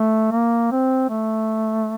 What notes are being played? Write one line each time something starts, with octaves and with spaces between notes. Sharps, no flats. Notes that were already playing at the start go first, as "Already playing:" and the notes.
Already playing: A3
A#3
C4
A3